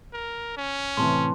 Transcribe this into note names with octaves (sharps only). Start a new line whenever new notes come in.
A#4
C#4
A2 C3 E3 A5 C6